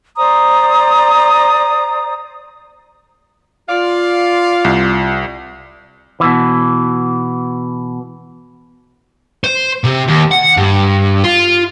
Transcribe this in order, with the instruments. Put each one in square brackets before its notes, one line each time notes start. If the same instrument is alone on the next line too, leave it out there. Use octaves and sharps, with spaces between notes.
[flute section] C5 D5 A#5 D#6
[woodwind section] F4 [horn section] D5 F5
[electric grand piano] C2
[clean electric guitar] B2 E3
[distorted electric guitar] C5
C3
D#2
F#5
G2
F4